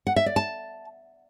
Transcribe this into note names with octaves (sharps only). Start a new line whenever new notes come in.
F#5
E5
D5
A5